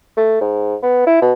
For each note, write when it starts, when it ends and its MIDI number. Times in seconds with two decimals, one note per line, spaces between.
0.17 0.37 57
0.41 0.75 44
0.83 1.06 59
1.07 1.21 64
1.22 1.33 47